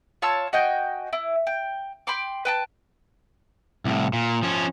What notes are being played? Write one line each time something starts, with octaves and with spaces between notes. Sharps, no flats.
F4 C#5 A5 E6
F#4 D#5 G5 G#5
E4
G5
G5 B5 C6 D6
B4 G5 A5
C2 A2
A#2
F3 C#4